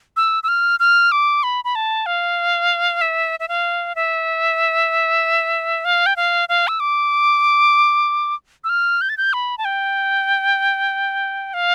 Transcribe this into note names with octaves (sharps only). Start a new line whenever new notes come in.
E6
E6
F6
F6
D6
B5
B5
A5
F5
E5
E5
F5
E5
F5
G5
F5
F5
E6
D6
E6
F6
G6
A6
G6
B5
A5
G5
F5